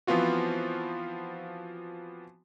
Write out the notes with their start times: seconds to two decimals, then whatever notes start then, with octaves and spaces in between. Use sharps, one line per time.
0.07 E3 F3 B3 C4 F4 F#4